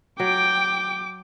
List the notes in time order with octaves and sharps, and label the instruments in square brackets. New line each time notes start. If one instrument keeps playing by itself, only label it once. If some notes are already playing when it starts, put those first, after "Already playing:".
[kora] F#3 [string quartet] G5 [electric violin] D6